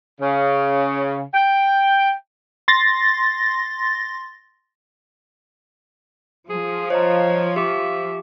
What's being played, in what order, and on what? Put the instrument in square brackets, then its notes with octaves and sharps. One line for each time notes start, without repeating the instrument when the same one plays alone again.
[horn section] C#3
G5
[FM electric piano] C6 A6 A#6
[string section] F3 [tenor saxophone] G#4
[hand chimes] C5 D#5 A#5 [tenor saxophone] C#5
[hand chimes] G4 D6 [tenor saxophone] E5